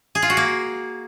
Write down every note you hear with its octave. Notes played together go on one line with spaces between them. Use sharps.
G#4
F4
F#4
A#3